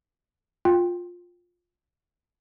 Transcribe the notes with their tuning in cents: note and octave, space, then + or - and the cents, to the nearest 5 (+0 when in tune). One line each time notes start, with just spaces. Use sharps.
F4 +15 G5 +10